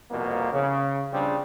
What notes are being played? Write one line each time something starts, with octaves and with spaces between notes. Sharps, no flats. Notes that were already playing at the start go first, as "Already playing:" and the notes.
C2 F2 B2 A#3
C#3
A#1 C#3 G3 C4 D4